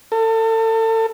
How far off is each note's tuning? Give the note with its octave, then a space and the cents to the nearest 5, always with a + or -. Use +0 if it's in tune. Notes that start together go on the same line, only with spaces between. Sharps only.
A4 +30